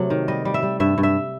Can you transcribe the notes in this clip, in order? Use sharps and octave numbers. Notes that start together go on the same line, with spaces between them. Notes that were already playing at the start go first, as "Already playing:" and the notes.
Already playing: C3 F#3 A3
D#3
G3 D#5
G3
E5
G3
G2 E5
G2
E5